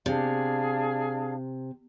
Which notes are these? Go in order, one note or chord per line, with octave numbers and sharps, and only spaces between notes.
C3 D4 G#4 F5